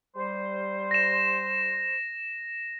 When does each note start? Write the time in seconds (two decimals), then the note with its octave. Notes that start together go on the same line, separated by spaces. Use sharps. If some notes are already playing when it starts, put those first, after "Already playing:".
0.15 G3 C5
0.91 A#6 E7